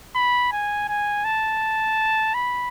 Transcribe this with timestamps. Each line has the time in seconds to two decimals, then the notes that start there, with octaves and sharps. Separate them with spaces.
0.15 B5
0.52 G#5
0.88 G#5
1.24 A5
2.34 B5